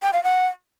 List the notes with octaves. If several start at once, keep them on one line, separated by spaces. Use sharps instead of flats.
G5
F5
F#5